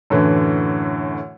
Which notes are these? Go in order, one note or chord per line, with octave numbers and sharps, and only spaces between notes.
F#2 A2 D3 E3